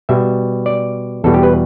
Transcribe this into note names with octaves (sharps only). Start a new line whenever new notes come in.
B2 G3 E5
D5
E2 B2 G3 A4
G4
B4